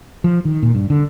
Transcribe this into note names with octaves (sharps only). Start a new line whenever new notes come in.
F3
D#3
A#2
G2
D3